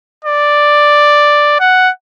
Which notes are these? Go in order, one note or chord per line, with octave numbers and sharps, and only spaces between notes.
D5
F#5